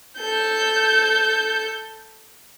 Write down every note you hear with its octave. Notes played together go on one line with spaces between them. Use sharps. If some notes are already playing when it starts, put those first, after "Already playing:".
A4 G6